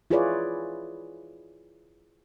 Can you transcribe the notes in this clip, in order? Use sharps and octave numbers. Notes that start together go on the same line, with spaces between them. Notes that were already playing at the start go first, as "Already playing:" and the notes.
E4 F4 G#4 B4 C#5 D5